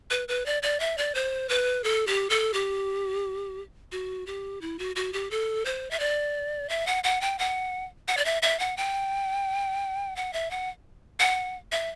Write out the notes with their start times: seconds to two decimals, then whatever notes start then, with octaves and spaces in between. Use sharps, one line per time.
0.11 B4
0.28 B4
0.46 D5
0.63 D5
0.80 E5
0.98 D5
1.15 C5
1.49 B4
1.84 A4
2.07 G4
2.30 A4
2.54 G4
3.92 F#4
4.27 G4
4.61 E4
4.79 F#4
4.96 F#4
5.13 G4
5.31 A4
5.65 C5
5.91 E5
6.00 D5
6.69 E5
6.87 F#5
7.04 F#5
7.21 G5
7.39 F#5
8.08 F#5
8.17 D5
8.25 E5
8.42 E5
8.59 F#5
8.77 G5
10.16 F#5
10.33 E5
10.51 F#5
11.20 F#5
11.72 E5